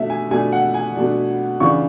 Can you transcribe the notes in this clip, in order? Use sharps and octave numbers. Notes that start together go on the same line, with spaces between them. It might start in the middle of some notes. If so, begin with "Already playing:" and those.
Already playing: B2 A3 D4 E5
G#5
B2 A3 D4 G#5
F#5
G#5
B2 A3 D4
C#3 E3 B3 D4 C#6